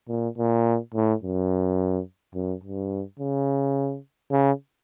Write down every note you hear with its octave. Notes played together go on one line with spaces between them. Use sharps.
A#2
A#2
A2
F#2
F#2
G2
C#3
C#3